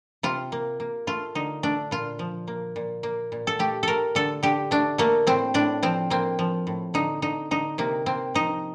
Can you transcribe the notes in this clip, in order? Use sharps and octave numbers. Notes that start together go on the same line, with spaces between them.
C3 F4
A#3
A#3
A3 F4
D3 D#4
A3 D4
A#2 F4
F3
A#3
A#2
A#3
A#2
A4
A3 G4
A3 A4 A#4
D3 A4
D3 G4
A3 D4
A3 A#3
A2 C4
A2 D4
F3 C4
A#3 C4
F3
A2
D3 D#4
D3 D#4
D3 D#4
C3 A#3
A#3 C4
F3 D#4